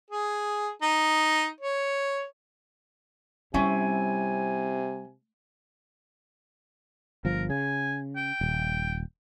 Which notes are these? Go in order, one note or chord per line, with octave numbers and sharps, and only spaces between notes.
G#4
D#4
C#5
C3 G3 C4 C#4 E4 G#5
G1 F3 A#4
C#3 G#5
G5
D#1